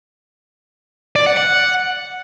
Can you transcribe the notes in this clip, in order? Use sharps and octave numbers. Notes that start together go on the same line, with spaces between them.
D5
F#5
F#5